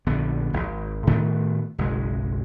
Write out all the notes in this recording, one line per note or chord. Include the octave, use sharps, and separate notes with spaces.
A#1 D3 B3
D#1 G#1
A2 D#3 A3 B3
F#1 B1 G#3